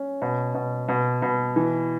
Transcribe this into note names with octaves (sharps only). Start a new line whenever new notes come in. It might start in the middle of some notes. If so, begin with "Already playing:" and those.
Already playing: C#4
B2
B2
B2
B2
E3